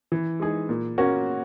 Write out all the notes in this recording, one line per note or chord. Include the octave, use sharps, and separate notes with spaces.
E3
G#3 D#4 G#4
A#2
A#3 C#4 F#4